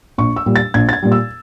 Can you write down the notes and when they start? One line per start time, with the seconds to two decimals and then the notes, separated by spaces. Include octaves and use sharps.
0.18 A#1 C#6
0.36 E6
0.46 A#2 G3
0.56 A6
0.74 A#1 G#6
0.89 A6
0.93 G#6
1.03 A#2 G3
1.12 E6